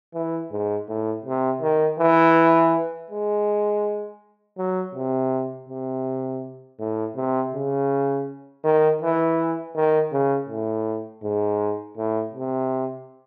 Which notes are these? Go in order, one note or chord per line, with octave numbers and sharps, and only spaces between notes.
E3
G#2
A2
C3
D#3
E3
G#3
F#3
C3
C3
A2
C3
C#3
D#3
E3
D#3
C#3
A2
G#2
A2
C3